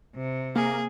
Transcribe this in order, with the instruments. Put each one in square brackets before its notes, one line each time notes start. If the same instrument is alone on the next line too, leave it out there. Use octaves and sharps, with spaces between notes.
[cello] C3
[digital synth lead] A#3 [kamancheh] G#4